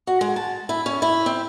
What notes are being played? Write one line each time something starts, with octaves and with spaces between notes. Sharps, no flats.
F#4
G#3
A5
E4
C#4
E4
C4